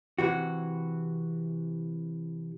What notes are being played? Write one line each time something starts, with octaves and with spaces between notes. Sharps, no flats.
C3 E3 F#4